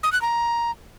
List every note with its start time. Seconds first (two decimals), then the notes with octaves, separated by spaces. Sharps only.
0.03 D#6
0.12 F#6
0.22 A#5